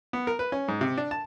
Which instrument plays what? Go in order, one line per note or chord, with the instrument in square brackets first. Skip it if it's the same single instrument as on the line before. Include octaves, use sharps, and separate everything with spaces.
[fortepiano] B3
A#4
B4
C#4
G#2
C3
D4
A5